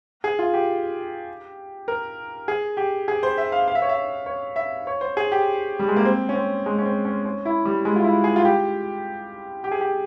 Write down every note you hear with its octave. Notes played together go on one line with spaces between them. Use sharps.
G#4
F4
G4
A#4
G#4
G4
G#4
C5
E5
F5
F5
E5
C#5
E5
C#5
E5
C#5
C5
G#4
G4
G3
G#3
A#3
C4
C#4
C4
G#3
C#4
C4
C#4
C#4
E4
G3
G#3
F4
E4
G#4
F4
G4
G4
G#4
G4